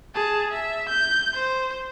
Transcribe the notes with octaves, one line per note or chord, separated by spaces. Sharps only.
G#4 A5
E5
G6
C5